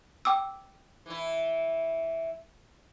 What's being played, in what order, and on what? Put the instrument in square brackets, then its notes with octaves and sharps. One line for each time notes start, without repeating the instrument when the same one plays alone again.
[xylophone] G5 D6 E6
[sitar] E3 E4